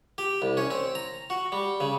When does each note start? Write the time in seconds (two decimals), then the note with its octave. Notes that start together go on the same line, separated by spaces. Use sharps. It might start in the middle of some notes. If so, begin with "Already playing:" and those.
0.18 G4
0.42 C2
0.57 C#4
0.71 C4
0.95 A#5
1.30 F#4
1.52 G3
1.80 C#3